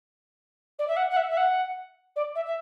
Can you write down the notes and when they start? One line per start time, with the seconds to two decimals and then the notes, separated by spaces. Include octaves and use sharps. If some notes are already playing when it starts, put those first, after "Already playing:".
0.79 D5
0.88 E5
0.96 F#5
1.10 F#5
1.16 E5
1.30 E5
1.37 F#5
2.16 D5
2.35 E5
2.46 E5